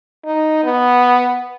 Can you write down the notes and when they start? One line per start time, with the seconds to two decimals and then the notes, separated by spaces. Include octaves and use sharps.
0.25 D#4
0.64 B3